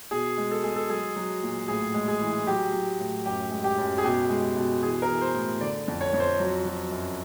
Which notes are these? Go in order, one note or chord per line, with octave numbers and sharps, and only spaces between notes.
B2 G#4
G#3
A4
G#3 G#4
A4
F#3 G#4
F#3
A#2
A2 G#4
G#3
G#4
E3
F#3 G4
F#3
A2
F#2 G4
G#3
G4
F#2
G#4
B2 G4
G#3
B2
E3 G#4
A#4
E3
C5
A2
D3 D5
F2
C#5
F2
C5
F#3
F#3
F#2